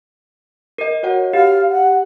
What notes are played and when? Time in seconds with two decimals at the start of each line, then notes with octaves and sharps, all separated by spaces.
0.78 A#4 D#5
1.03 F#4 C#5 F#5
1.33 G4 F5
1.70 F#5